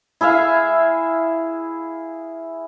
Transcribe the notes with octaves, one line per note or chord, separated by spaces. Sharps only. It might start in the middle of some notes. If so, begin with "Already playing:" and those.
E4 G#4 E5 F5